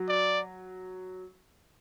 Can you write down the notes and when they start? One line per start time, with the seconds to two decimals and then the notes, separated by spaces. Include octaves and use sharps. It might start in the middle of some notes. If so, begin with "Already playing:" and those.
Already playing: F#3
0.09 D5